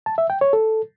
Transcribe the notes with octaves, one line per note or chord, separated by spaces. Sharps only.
A5
E5
G5
C#5
A4